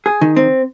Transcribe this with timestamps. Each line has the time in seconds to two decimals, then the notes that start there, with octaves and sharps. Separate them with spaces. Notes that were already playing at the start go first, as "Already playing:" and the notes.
0.06 G#4
0.21 D#3
0.36 C4